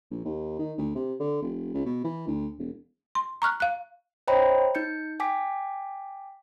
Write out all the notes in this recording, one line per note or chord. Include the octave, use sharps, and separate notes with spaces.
A#1
D#2
D#3
D2
C3
D3
F1
C#2
B2
E3
D2
E1
C6
A#5 C#6 F6 F#6
F5 F#6
C5 C#5 D#5 G5 A#5 B5
D#4 G6 C#7
G5 G#5 D6 B6